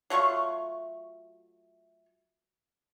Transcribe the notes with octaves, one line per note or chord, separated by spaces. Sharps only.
F#3 A3 F4 C#6